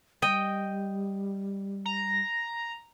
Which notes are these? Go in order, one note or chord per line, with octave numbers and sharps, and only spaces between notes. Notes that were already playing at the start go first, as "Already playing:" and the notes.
G3 D#5 G5
A#5